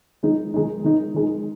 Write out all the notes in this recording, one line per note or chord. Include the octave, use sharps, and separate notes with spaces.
D#3 G#3 D#4
D#3 G#3 D#4
D#3 G#3 D#4
D#3 G#3 D#4